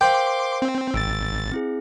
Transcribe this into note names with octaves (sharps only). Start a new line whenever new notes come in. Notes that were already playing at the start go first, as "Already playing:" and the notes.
A#4 C5 F5 G5 C6 D6
C4
G#1 E6 A6 D7
C4 E4 G#4